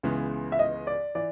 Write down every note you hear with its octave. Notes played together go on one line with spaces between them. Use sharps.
C#2 C#3 E3 G#3 B3
E5
D#5
D5
E3 D5